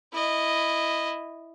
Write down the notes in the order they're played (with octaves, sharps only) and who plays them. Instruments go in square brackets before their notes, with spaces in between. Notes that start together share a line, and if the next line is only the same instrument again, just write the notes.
[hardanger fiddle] E4 D#5